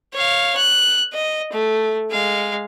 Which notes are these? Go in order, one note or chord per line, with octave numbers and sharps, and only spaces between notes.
C#5 F5
F#6
D#5
A3
G#3 F5